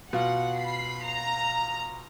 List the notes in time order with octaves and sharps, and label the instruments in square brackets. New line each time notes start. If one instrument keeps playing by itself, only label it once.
[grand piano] B2 F4 [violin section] F#5
[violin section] B5 C7
A#5